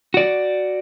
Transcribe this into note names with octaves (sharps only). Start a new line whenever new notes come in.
F#4 D5